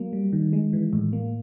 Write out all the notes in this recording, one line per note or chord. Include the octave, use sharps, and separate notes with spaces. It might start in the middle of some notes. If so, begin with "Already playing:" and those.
Already playing: F#3 A#3
G3
D#3
G#3
E3
A2
A#3